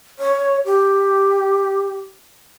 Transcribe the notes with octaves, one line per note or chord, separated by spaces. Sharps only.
C#5
G4